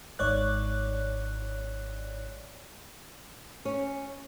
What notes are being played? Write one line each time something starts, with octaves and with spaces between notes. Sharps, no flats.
G#1 G#2 C#5 D5 F#6
C#4